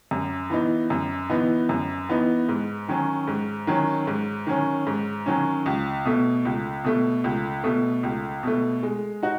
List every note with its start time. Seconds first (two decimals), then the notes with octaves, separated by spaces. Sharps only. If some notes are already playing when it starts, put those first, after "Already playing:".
0.11 F#2
0.50 E3 B3 D#4
0.90 F#2
1.30 E3 B3 D#4
1.69 F#2
2.09 E3 B3 D#4
2.49 G#2
2.88 D#3 F#3 C#4
3.28 G#2
3.67 D#3 F#3 C#4
4.07 G#2
4.47 D#3 F#3 C#4
4.87 G#2
5.26 D#3 F#3 C#4
5.66 C#2
6.05 B2 A3
6.45 C#2
6.84 B2 A3
7.24 C#2
7.64 B2 A3
8.03 C#2
8.43 B2 A3
8.83 G#3
9.23 D#4 F#4